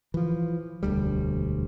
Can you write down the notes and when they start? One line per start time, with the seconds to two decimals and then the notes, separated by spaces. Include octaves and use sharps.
0.14 E3 F3
0.83 E1 D2 G3